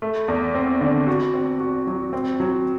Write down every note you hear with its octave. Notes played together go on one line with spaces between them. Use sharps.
A3
E2
C4
D3
F#4
C4
F#4
F#3
C4
F#3